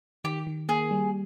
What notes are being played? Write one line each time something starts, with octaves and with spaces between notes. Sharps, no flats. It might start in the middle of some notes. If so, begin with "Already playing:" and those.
D#3 G4
D#3
A#3 G#4
G3